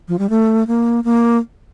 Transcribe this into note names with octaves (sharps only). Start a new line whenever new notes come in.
F3
G3
A3
A#3
A#3